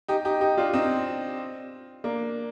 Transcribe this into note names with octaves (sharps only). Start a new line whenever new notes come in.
D#4 G4
D#4 G4
D#4 G4
D4 F4
C4 D#4
A#3 D4